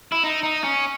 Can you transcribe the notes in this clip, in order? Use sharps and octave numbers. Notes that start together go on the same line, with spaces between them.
E4
D#4
D#4
C#4